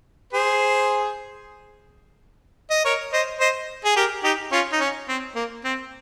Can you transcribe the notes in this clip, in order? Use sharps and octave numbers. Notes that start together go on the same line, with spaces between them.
G#4 C5
D#5
A#4 C#5
C5 D#5
C5 D#5
G#4
G4 A#4
D#4 G4
C#4 F4
D#4
C#4
C4
A#3
C4